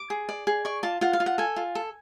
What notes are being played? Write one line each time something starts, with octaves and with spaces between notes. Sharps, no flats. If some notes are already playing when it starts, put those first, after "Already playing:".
Already playing: D6
G#4
D5
G#4
D5 C#6
F4 A5
F4 F#5
F5
F4
F#5
A4 G#5
F4
A4